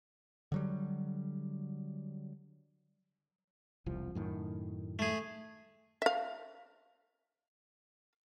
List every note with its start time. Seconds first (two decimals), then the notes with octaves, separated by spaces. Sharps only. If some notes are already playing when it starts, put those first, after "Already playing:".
0.52 D3 F#3 G3
3.86 E1 C2 F3
4.15 F#2 A2 D#3
4.99 A3 G#4
6.02 E5 F5